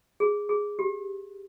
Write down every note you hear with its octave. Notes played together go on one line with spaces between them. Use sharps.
G#4
G#4
G4